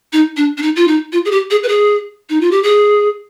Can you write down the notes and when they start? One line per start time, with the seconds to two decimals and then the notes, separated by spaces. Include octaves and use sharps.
0.13 D#4
0.37 D4
0.58 D4
0.62 D#4
0.76 F4
0.88 D#4
1.13 F4
1.25 G#4
1.32 G4
1.51 G#4
1.63 B4
1.69 G#4
2.30 D#4
2.41 F4
2.51 G4
2.63 G#4